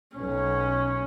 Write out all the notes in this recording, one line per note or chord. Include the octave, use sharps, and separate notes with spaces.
B1 C#4